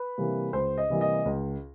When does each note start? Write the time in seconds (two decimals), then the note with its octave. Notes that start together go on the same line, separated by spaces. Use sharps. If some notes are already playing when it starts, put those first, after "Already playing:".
Already playing: B4
0.18 C3 E3 G3 A#3
0.53 C#2 C5
0.78 D#5
0.90 C3 E3 G3 A#3
1.01 D#5
1.25 C#2